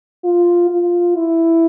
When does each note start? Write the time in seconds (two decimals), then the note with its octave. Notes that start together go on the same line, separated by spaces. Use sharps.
0.24 F4
0.70 F4
1.17 E4